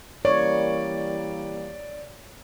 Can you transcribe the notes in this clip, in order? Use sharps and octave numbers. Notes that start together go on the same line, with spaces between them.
E3 G3 A#3 C#5 D5